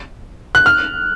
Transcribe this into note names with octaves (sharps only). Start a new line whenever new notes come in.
F#6
F6